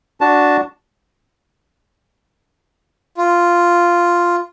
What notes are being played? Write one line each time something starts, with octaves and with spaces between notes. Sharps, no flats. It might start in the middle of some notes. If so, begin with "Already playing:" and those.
D4 F#4 A5
F4